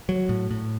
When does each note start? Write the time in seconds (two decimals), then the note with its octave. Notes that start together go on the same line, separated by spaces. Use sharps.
0.09 F#3
0.29 A2
0.51 A2